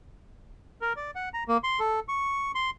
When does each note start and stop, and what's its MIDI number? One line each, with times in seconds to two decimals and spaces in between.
0.81 0.93 70
0.96 1.11 74
1.15 1.29 78
1.34 1.44 82
1.48 1.57 58
1.64 1.79 84
1.80 2.00 69
2.08 2.52 85
2.55 2.70 84